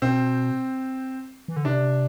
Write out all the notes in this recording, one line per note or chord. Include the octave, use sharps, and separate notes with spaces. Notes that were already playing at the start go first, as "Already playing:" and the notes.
B2 C4
E3
D3
C3 D4